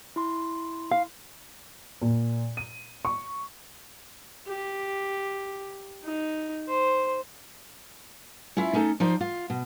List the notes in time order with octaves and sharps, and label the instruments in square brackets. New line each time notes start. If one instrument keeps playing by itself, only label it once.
[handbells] E4 C6
[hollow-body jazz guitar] F5
[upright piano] A#2
D#7
C#6
[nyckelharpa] G4
D#4
C5
[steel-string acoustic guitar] C#4 E4 F4 E5
A3 C#4 D#4 A4
F3 D#4 C5 D5
F4
B2